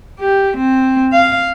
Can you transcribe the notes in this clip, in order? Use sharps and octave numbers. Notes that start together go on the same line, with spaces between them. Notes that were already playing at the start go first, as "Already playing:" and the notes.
G4
C4
F5